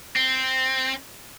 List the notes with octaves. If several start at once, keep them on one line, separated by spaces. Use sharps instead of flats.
C4